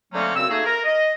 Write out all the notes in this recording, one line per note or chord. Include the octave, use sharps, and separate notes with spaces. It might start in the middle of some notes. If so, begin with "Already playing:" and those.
D3 F#3 A3 A#3 C4 C#4
F#2 C#3 C4 E6
A3 A#3 D#4 F#4 G#4
A#4
D#5